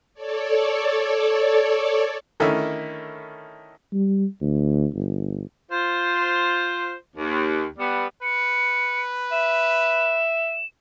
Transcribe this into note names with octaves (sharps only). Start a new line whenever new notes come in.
A4 C#5 D5
D3 D#3 A3 C#4 E4
G3
D2
G1
F4 C5
D#2
G3 B3
B4 C#7
E5 E7